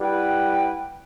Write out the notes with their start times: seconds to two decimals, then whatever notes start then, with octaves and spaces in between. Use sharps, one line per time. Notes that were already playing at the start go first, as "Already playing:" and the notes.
0.01 G3 E4 B4 F#5 G5